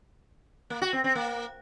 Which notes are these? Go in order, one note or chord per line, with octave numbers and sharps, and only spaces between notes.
A#3
F#4
C4
C4
A#3